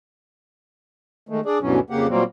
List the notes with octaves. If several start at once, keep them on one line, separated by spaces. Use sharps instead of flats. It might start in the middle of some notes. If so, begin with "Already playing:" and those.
D#3 G#3 A3
D4 G#4 D5
D2 G2 B2 E3 F#3 C#4
F2 C#3 A#3 G4 F#5
A#2 F#3 G3 A#3 C4